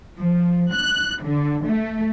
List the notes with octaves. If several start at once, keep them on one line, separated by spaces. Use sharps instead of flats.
F3
F#6
D3
A3